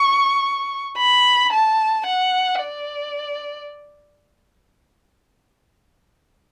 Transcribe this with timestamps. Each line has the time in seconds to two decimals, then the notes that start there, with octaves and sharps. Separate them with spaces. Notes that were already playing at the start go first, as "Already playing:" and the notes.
Already playing: C#6
0.97 B5
1.52 A5
2.06 F#5
2.62 D5